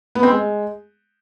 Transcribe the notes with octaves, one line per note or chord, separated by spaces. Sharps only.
B3
C4
G#3